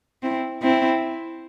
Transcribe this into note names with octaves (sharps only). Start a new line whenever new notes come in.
C4 E4
C4 E4